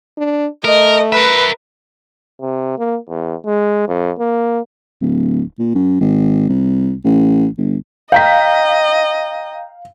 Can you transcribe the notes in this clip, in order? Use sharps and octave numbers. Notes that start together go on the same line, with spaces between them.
D4
A3 A#4 D#5
A#4 B4 E5
C3
A#3
E2
G#3
F2
A#3
D1
A#2
F#2
G#1
C2
A1
G1
D#5 F5 G5 A#5 G6 B6